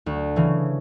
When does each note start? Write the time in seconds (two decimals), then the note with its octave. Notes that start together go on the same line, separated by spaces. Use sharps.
0.06 D2
0.36 C#3 E3